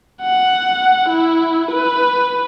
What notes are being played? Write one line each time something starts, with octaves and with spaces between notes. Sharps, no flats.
F#5
E4
B4